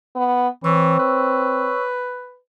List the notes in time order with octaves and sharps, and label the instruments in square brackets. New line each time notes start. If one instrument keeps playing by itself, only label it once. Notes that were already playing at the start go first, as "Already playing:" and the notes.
[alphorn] B3
[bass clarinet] E3 [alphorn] C4 [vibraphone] C#5 C#6 E6
[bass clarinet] B4